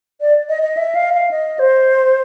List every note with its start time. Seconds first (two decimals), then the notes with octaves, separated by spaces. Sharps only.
0.21 D5
0.49 D#5
0.62 D#5
0.77 E5
0.95 F5
1.14 F5
1.31 D#5
1.59 C5